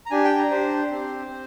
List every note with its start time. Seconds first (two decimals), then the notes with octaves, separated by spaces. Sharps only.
0.06 A#5
0.11 D4 G4 G#5
0.24 G5
0.38 A#5
0.51 D4 G4 C5
0.91 C4 G4
1.31 C4